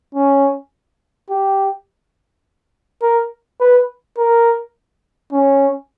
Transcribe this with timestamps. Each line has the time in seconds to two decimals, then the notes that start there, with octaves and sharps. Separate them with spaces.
0.15 C#4
1.30 G4
3.02 A#4
3.60 B4
4.18 A#4
5.33 C#4